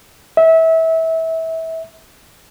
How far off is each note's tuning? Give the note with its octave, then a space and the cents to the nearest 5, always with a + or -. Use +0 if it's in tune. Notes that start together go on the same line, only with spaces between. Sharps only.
E5 -25